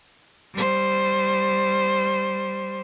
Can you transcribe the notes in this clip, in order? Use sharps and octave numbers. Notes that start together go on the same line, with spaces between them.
G3 C5